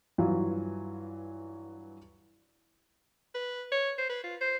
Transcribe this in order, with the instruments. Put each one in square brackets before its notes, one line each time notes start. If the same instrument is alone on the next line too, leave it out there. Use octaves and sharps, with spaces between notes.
[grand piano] G2 E3 F#3 F4
[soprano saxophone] B4
C#5
C5
B4
F4
C5